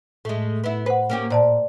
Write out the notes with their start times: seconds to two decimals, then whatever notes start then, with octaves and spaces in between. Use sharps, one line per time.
0.25 A2 G#3 A3
0.64 B3 E4
0.86 B4 C5 F#5
1.10 A#3 C#4 G4
1.30 A#2 C5 D5 A5